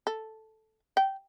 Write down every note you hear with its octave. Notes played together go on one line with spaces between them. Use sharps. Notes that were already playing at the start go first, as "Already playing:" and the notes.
A4
G5